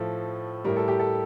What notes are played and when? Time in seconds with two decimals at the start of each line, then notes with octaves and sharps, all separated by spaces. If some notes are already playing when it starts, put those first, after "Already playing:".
Already playing: A2 F3 A4
0.65 A2 G3 A#4
0.77 A4
0.88 G4
1.00 A4